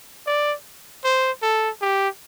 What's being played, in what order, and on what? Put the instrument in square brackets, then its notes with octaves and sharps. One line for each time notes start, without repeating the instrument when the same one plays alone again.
[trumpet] D5
C5
A4
G4